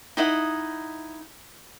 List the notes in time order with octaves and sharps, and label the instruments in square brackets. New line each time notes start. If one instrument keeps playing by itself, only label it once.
[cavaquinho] D#4 E4 D#5 F#5